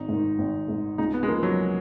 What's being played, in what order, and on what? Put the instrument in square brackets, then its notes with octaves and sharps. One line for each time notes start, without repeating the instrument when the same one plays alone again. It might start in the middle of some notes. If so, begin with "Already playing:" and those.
Already playing: [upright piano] G#1 [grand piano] D#4
[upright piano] G#2 D#3
G#1
G#2 D#3
[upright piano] C#2 [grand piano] D#4
[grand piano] B3
G#3
[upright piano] C#3 F3 [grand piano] A#3
[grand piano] F#3